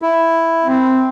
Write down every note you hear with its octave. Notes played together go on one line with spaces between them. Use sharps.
E4
C4